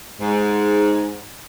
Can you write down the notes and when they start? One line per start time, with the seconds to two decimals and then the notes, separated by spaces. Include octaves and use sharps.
0.20 G#2